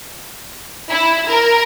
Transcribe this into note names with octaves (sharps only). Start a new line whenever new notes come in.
E4
A#4